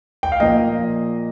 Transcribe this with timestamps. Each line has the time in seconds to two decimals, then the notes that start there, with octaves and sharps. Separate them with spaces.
0.23 G5
0.32 F5
0.40 A#2 F3 A#3 D#5